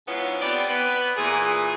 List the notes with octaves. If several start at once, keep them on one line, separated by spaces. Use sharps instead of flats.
G#2 C#3 B3 C#4 E4 F4
B3 C4 G4 D5
B3 B4
A#2 E3 G#4